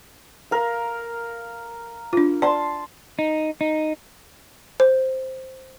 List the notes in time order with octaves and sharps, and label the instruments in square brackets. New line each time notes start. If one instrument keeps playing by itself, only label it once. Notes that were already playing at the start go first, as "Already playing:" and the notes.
[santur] A#4 F5
[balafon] D4 F4
[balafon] D5 [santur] A5 C6
[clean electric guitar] D#4
D#4
[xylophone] C5